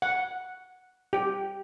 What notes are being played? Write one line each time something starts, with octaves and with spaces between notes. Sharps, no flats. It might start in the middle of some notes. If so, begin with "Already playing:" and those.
F#5
G4